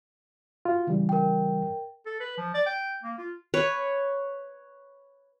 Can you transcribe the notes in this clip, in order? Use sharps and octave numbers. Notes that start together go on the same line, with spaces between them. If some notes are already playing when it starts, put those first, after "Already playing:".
F4 F#4
C#3 E3 G3
A#4 G5
A4
B4
F3
D5
G5
A#3
F4
B4 C#5